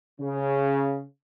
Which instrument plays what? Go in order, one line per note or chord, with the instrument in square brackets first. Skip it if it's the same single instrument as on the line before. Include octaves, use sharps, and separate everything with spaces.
[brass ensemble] C#3